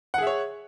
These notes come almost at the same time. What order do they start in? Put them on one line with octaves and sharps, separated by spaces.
F#5 G#4 E5 C#5